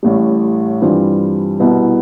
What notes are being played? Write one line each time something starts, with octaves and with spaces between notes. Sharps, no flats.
A1 A2 G3
G2 E3 G3 C4 F4
C2 B2 B3 E4